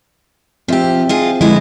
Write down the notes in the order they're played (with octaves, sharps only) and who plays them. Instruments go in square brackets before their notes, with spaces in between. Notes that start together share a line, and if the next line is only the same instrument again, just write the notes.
[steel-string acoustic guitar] F3 G4 [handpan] C4 E5
[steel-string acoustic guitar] D#4 F4 G#4
[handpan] D3 F3 D#5 [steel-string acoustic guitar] G#3 B3 E4